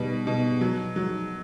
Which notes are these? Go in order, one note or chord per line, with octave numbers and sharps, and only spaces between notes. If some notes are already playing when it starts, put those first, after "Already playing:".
Already playing: B2 G3
B2
F#3
F#3